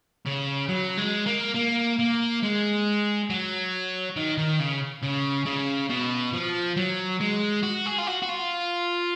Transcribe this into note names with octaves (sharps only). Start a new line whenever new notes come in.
C#3
F#3
G#3
A#3
A#3
A#3
G#3
F#3
D#3
D#3
C#3
C#3
C#3
B2
F3
F#3
G#3
F#4
G#4
F4
F#4
F#4
F4